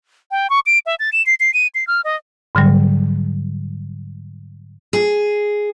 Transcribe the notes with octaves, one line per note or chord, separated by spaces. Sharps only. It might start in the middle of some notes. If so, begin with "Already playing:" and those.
G5
C#6
D7
E5
A6
E7
C7
C7
D#7
C7
F6
D#5
G#2 D3 F#3 G3
G#4